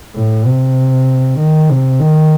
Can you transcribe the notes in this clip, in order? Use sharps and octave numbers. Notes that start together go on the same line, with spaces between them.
A2
C3
D#3
C3
D#3